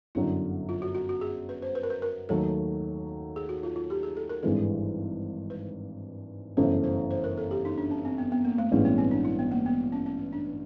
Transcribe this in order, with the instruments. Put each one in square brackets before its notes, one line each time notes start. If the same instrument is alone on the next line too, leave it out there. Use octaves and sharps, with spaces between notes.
[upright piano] G1 F#2 D3 F#3 [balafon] E4
[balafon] F4
F#4
F#4
F#4
G#4
B4
C5
B4
A#4
B4
A#4
[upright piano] D#2 D#3 F#3 A3 [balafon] A4
[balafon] G#4
F#4
F4
F4
G4
G#4
A4
A#4
[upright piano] G#1 G2 E3 G#3 [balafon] A4
[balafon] B4
[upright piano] G1 F#2 C#3 E3 A3 [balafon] C5
[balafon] C5
C5
A#4
A4
G4
D#4
D4
C#4
C4
B3
B3
A#3
A3
[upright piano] A1 G2 E3 G#3 C#4 [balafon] A#3
[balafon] B3
C4
D4
E4
B3
A#3
B3
C#4
C#4
D4